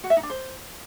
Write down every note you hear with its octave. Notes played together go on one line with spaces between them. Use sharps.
F#4
E5
D#4
D4
C5